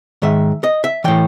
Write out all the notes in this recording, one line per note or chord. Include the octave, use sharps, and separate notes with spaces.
G#2 D#3 E5
D#5
E5
A2 E3 G5